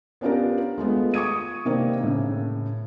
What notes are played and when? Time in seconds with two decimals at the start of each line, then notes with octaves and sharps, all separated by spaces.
0.21 B3 C#4 D4 F4 G4 A#4
0.78 G#3 A3 B3 F4
1.14 C#6 D#6 G#6 D#7
1.65 C3 D#3 A#3 C4 D4
2.03 A2 C#3